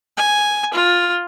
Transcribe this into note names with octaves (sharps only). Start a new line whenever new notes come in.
G#5
F4